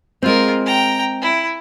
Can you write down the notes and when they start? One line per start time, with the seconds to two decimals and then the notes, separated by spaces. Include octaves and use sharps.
0.22 G#3 C4 F4 A#4
0.66 G5 A#5
1.22 E4